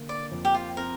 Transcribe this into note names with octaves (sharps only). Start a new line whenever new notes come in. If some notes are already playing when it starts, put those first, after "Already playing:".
Already playing: D3 A#3
D5
F2
G4
F4
C4 A#4